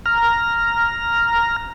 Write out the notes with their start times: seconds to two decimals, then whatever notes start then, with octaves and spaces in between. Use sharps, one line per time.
0.06 A#5 F6